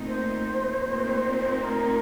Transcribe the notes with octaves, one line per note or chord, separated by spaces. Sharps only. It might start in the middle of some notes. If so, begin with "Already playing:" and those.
Already playing: A#2 A3 C4 D#4
C5
A#2 A3 C4 D#4
A#4